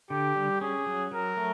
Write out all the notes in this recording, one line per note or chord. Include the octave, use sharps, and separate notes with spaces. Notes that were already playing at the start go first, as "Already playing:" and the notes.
D3 G4
G3
C#4 G#4
F#3
F#3 A#4
A3